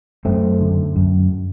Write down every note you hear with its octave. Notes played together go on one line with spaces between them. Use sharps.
F#2 A3 C4
D3
F#2